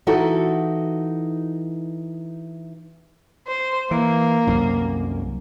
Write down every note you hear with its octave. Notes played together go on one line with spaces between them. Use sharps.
E3 D#4 E4 F#4 G4 A4
C5
E3 A#3
C2 F#2